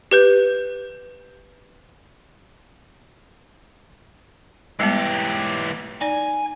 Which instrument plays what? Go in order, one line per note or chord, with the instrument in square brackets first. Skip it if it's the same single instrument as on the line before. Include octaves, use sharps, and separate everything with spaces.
[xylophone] G4 B4 G6
[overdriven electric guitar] E3 G4 [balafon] G3 G#3 B3
[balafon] D#4 D5 [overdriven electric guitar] G#5